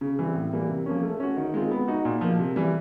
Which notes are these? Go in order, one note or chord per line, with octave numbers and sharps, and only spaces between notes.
C#3
E3 G3 C4
A2
E3 G3 A#3
C3
F3 A#3 C#4
A3
C#4 F#4
D#3
G#3 C4 F4
B3
D#4 F#4
A#2
F3 A#3
C3
E3 G3